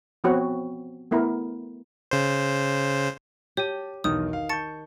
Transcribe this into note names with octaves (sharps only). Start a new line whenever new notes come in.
F3 B3 C4 F#4 C#5
A3 B3 E4 A#4
C#3 C5
G4 C#5 A5 D#7
B1 E2 D#3 D#6
F5
A5 C#6 G6 A6 C#7